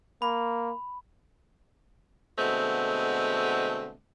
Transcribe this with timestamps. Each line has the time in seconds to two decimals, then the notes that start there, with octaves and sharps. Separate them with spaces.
0.22 A#3 B5
2.39 B2 D3 G#3 A3 C4